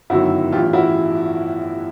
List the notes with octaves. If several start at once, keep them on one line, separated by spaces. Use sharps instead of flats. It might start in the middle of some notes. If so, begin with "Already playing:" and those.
G1 F#2 D#3 F#3 E4 F#4
A1 G2 E3 F4 G4
E4 F#4